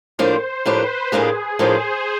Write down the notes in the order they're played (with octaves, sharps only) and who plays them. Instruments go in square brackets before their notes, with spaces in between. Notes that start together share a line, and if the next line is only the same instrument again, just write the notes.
[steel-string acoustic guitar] A2 F3 A#3 D4 G4 [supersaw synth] C5
[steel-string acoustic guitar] A2 F3 A#3 D4 G4 [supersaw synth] B4
[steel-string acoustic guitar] A2 F3 A#3 D4 G4 [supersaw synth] G#4
[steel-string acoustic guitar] A2 F3 A#3 D4 G4 [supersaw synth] C5